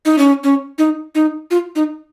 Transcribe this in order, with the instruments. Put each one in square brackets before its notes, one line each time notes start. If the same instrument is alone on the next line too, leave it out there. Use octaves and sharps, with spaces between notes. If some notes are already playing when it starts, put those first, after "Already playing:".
[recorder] D#4
C#4
C#4
D#4
D#4
F4
D#4